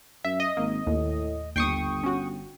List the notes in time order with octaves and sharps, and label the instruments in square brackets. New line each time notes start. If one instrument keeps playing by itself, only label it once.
[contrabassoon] F#2 [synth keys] E5
[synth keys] D#5
[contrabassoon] G#1 [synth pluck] A#3
[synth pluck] D#2 [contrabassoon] A2
[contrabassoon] G1 [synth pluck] D#2 C7 [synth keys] G5 C#6 D#6
[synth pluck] C#4 F#4